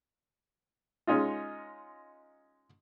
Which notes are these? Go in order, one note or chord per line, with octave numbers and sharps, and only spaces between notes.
G#3 C#4 D#4 F4